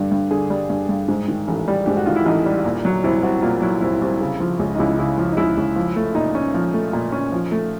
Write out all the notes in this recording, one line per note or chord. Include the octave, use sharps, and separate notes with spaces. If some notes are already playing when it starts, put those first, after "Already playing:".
Already playing: G2 D3 G3
G2
D3 G#4
G3
G2
G2
G#2
D#3
A1
G3
G#2 G4
F#4
D#3 F4
E4
A1 D#4
G3
A#2
F#3
C2 E4
C2 F#4
A#2 F4
F#3 E4
C2 E4
C2
C#3
F3
C#2
D#4
C#2 E4
C#3 E4
F3
D#4
C#2 E4
C#2
F3
A3
A#2 D#4
C#4
F3
A3
A#2
C#4
F3
A3